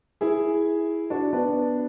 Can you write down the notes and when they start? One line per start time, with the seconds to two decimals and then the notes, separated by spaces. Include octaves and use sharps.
0.21 E4 G#4
1.10 D4 F#4
1.33 B3 D4